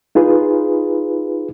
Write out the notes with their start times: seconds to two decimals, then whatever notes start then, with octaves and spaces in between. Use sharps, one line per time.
0.15 D#4 F4 G#4 B4